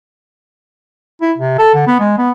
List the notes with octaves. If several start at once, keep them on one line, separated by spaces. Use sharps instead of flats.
E4
C3
A4
D3
B3
G#3
B3